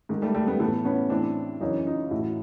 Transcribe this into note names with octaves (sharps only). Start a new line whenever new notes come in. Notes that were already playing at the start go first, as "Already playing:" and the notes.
G#2 D#3
G3 A3
G3 A3
A3 B3
A2 E3 A3 B3
B3 C#4
A2 E3 C4 D4
F#2 C#3 E3 C#4 D#4
D#4 F4
A2 E3 E4 F#4